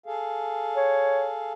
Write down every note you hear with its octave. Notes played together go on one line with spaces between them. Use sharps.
G#4 A4 F5
C#5